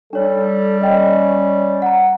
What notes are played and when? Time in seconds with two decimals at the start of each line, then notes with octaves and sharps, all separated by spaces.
0.13 G3 D4 A4 C#5
0.81 C#4 D#5 G5
1.82 F#5 A#5